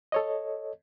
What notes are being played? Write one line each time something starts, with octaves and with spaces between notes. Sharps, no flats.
A4 C#5 D#5